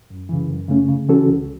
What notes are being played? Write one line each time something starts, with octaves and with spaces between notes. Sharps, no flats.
F#2
C#3 E3
F#2
C#3 A3 C#4
C#3
E3 C#4 F#4 A4
C#2